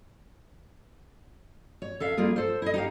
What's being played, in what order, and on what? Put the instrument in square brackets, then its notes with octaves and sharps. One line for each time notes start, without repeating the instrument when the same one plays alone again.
[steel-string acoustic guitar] C#5
A4 E5 F5
G3 A#3 F4 G#4
A4 C5
E4 D#5
D#4 G4 F5